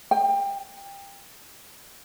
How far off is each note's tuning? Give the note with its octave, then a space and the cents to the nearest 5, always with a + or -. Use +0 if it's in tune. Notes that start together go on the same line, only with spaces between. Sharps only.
G5 +20